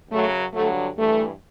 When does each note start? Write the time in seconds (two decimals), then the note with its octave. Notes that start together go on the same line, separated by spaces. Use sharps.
0.10 F#2 C#3 F#3 A3
0.53 G2 D3 F#3 A3
0.96 G2 E3 A3